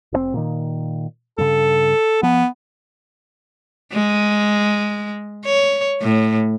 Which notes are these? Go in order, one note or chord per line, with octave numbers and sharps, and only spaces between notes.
F1 B2 C4
A#2 D#3
G2 C#3 A4
F3 B3
G#3
C#5
A2